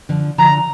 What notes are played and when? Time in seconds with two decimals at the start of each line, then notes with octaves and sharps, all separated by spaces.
0.09 D3 F3
0.38 D3 F3 A#5